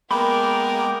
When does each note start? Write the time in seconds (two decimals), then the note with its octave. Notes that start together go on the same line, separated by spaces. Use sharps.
0.11 G#3 A#3 B3 A#4 G5 B5 D6